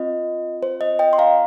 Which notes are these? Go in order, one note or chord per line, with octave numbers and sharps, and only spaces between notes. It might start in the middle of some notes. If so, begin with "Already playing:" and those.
Already playing: C4 F4 D#5
C5
D#5
D#5 G5
C6
F5 A#5